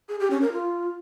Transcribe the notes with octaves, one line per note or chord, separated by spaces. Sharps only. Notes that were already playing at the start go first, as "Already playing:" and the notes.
G#4
G4
C#4
A#4
F4